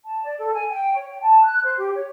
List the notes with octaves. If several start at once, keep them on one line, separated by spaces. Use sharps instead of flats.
A5
D5
A4
G#5
G5
C#5
G5
A5
F#6
C5
G4
C#5